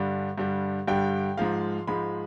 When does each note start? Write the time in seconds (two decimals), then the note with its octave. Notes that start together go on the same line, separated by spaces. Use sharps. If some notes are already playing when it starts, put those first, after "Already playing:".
Already playing: G2 D3 G3
0.38 G2 D3 G3
0.88 G2 D3 G3 G5
1.37 G#2 F3 G#3 F5
1.87 G#2 F3 G#3 B5